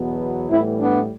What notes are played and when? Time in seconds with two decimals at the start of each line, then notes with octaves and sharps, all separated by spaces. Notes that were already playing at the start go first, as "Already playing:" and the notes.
Already playing: E2 B2 F#3 B3
0.50 A2 E3 G3 B3 C4 E4
0.81 B3 D4